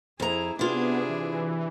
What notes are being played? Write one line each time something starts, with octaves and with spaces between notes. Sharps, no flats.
F2 E4 G#4 A#5
C3 B3 D4 E4 F4 G#4
E3